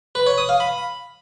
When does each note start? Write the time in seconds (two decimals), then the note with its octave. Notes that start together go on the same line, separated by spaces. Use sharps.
0.15 B4
0.26 C#5
0.38 D#6
0.49 F5
0.60 B5